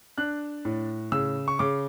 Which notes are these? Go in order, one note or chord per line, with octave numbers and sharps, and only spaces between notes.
D4 F#6
A2
C#3 E6
C#6
C#3 D6